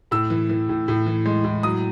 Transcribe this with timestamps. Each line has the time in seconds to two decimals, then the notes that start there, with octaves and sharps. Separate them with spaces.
0.11 A2 E6
0.30 E3
0.49 E3
0.69 A2
0.88 A2
1.06 E3
1.26 G#3
1.44 A2
1.63 F#3 D#6